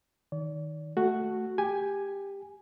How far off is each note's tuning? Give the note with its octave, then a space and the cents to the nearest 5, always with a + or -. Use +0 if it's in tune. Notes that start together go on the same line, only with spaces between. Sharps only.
D#3 +0 D5 -40
A3 +0 F#4 +0
G4 +15 G#5 +0